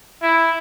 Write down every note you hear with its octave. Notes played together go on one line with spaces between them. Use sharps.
E4